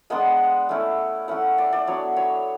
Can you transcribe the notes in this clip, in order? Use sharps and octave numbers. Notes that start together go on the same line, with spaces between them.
G#3 B3 D4 F#5
A3 C#4 E4
A3 C#4 E4 F#5
D5
D5
F#3 B3 D4 C#5
C#5